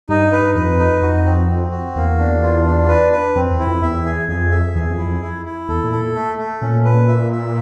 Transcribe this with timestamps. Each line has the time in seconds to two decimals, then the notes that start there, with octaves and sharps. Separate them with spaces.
0.09 G2 D#4
0.33 B4
0.55 F2 B4
0.79 D#4
1.02 F2 F#4
1.26 C4
1.49 C4
1.72 F#4
1.96 E2 A#3
2.19 D4
2.43 F4
2.66 D4
2.88 B4
3.12 B4
3.35 F2 C4
3.51 E2
3.59 E4
3.67 F2
3.82 E2 E5
4.05 G#4
4.29 F2 G#4
4.51 E5
4.75 E2 G#4
4.91 F2
4.98 E4
5.06 F2
5.22 E4
5.46 E4
5.69 E2 A4
5.84 A#2
5.92 A4
6.00 A#2
6.15 A3
6.39 A3
6.62 A#2 C#4
6.85 B4
7.08 E5
7.32 E5